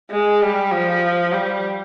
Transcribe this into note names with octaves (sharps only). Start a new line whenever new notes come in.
G#3
G3
F3
G3